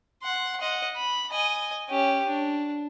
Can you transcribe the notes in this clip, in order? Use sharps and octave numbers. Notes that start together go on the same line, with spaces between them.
F#5 C6
D#5 F#5
B5
D#5 G#5
C#4 G4
D4